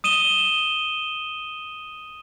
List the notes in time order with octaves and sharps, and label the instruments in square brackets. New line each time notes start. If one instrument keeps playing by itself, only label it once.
[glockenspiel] D#6 D#7 E7 G7